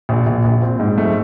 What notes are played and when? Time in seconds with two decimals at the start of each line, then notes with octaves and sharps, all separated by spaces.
0.09 A#1
0.26 A#1
0.44 A#1
0.62 C4
0.79 G#2
0.98 A3